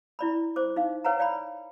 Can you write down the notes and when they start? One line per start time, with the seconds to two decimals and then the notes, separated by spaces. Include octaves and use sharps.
0.19 E4 D5 B5
0.56 C5 D6
0.76 D#4 F5
1.04 B4 C#5 F5 F#5 G#5 A#5
1.19 D5 F5 G5 G#5 B5